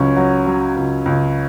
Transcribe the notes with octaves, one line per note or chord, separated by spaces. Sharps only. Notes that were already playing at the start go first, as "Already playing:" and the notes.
Already playing: C#2 F#3 C#4
F#3
F#3
C#2
C#2